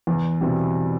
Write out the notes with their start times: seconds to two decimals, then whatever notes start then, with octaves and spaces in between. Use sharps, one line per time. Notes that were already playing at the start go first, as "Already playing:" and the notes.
0.07 E2
0.41 B2 G3 C4 E4